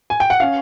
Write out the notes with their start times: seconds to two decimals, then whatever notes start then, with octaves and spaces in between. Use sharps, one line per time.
0.10 G#5
0.20 G5
0.30 F#5
0.40 C#4 F5